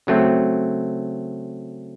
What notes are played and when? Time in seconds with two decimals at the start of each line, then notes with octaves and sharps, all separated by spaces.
0.07 C#3 F#3 A3 C4